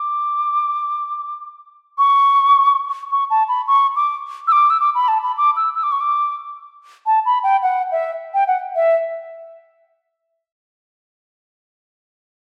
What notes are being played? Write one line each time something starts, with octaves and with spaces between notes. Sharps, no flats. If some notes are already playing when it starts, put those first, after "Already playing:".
Already playing: D6
C#6
C#6
A5
B5
C#6
D6
E6
D6
E6
D6
B5
A5
B5
D6
E6
E6
D6
C#6
D6
A5
B5
G5
F#5
E5
G5
F#5
E5